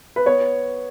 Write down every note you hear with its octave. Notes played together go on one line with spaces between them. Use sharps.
B4
B3 C#5